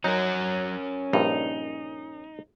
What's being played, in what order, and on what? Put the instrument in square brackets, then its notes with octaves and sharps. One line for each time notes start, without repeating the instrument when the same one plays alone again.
[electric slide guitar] F#3 [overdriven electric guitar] C#4 A#4 [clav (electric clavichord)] D#4
[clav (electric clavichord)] A#1 G2 [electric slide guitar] D#4